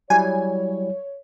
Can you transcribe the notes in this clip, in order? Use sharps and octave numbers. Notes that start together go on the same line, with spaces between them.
F#3 G3 E4 C#5 G#5